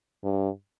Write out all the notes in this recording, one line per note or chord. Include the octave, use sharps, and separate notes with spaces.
G2